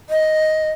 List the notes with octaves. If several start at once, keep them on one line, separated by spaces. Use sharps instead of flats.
D#5